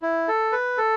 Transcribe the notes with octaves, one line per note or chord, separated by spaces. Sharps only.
E4
A4
B4
A4